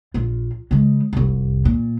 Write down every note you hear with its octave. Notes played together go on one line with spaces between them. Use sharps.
A#1 F4
C#3 G#3
F1 C2
A#2